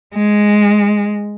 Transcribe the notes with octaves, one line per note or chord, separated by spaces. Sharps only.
G#3